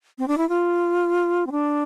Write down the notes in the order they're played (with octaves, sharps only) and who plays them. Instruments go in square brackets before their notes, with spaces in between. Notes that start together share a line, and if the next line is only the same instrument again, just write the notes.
[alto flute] C4
D4
E4
F4
C4
D4